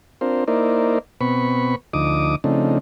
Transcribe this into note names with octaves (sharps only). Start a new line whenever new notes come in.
C4 D4 F4 A#4 C5
A#3 D#4 E4 A#4 C5 D5
B2 B3 C4 B5 C#6
D2 F3 D#4 D6 D#6
C#3 F3 A3 C4 D4 D#4